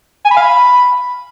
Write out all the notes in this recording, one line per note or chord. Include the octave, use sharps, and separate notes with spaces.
G#5
B5
F5
B5